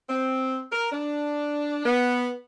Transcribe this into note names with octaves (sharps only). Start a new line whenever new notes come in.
C4
A#4
D4
B3